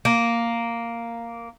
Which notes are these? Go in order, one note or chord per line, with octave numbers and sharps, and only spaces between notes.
A#3